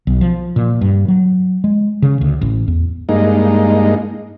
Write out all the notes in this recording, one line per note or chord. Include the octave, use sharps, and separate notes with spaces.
B1
F3
A#2
G2
F#3
G#3
C#3
D2
A1
E2
G2 G#3 A#3 D#4